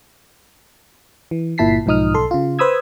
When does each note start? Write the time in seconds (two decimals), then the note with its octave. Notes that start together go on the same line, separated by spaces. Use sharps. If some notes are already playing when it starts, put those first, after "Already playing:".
1.31 E3
1.58 G1 A#2 E4 A5 B6 C7
1.86 B1 G#2 F3 D#4 D#6 F6
2.14 B1 A4 C6
2.31 C#3 F4
2.59 B4 C5 B5 D#6 E6 G#6